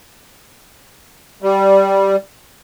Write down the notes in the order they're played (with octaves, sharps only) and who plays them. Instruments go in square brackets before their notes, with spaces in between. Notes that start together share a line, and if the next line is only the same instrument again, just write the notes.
[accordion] G3